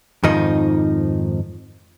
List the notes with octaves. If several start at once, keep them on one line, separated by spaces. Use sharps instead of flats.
F2 G#2 D#3 F3 D#4